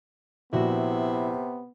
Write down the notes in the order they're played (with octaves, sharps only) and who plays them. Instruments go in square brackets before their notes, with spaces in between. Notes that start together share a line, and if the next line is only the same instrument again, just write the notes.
[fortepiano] A#1 F#4 [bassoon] C3 [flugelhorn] B3 [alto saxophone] E4